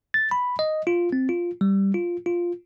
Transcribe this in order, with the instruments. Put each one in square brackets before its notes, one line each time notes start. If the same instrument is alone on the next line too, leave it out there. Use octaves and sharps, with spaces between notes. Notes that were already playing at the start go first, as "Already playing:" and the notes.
[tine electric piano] A6
B5
D#5
F4
C4
F4
G3
F4
F4